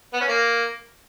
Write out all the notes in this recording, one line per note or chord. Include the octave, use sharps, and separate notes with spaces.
B3
C#4
A#3